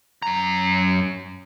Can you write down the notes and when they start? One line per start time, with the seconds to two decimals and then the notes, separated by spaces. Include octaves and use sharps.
0.22 F#2 A#5